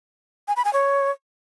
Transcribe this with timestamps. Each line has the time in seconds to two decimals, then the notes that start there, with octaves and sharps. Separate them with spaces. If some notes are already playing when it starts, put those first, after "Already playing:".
0.48 G#5
0.56 B5
0.65 G#5
0.73 C#5